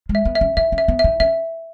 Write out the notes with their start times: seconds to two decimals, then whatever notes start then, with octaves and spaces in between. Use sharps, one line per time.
0.09 G#3
0.15 E5
0.25 B3
0.35 E5
0.41 C#4
0.57 D#4 E5
0.72 C#4
0.78 E5
0.88 B3
0.99 E5
1.04 D#4
1.20 C#4 E5